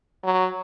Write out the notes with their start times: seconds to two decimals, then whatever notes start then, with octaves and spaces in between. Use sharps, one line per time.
0.24 F#3